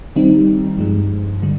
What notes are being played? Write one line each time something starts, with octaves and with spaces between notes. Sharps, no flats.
D#3 G3 C4 D#4
G2 F3 G#3
D3 G3